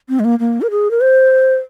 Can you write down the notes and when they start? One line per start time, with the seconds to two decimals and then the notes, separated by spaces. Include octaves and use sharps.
0.09 C4
0.20 G#3
0.25 A#3
0.39 A#3
0.62 A#4
0.71 G#4
0.91 A#4
1.01 C5